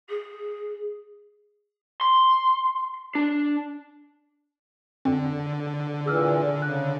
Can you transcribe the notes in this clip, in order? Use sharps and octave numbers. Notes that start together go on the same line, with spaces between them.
G#4
C6
D4
F2 D3 C4
A#2 E3 G#4 E6 F6
C#3 F#6